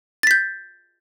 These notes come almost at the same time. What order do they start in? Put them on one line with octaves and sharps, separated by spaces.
A6 B6 G6